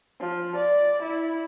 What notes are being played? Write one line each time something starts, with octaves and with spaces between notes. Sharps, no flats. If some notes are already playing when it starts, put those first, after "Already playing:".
F3
D5
E4